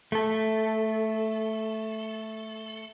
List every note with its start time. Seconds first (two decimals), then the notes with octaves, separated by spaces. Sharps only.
0.12 A3 A4